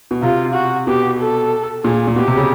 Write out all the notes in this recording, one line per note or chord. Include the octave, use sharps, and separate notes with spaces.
B2
C3 F4
F#4
B2 G4
A4
A#2 G#4
A#2
B2 G4
C3
C#3